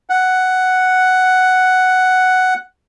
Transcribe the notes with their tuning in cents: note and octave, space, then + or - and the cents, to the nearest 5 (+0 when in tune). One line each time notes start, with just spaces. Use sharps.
F#5 +5